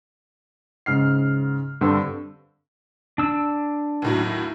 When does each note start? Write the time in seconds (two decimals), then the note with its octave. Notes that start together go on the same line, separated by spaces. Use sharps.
0.86 G#2 C#3 F6 C7
1.81 G2 D3 C4 A4 C6 E6
3.18 D4 E6
4.02 D#2 A2 F#3